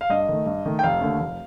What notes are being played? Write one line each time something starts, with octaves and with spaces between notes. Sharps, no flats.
F5
G2 D#5
D#3 A3
G2
D#3 A3
G5
F1 F5
D#2 D3 A3
F1